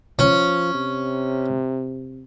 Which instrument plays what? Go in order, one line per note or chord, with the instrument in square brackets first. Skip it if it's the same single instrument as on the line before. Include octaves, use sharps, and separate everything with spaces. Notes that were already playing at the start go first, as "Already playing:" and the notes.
[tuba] F3 [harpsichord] C#4
[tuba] C3